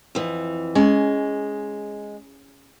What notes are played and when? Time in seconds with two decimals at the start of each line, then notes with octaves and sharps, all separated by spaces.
0.15 F2 E3
0.75 G#3 C#4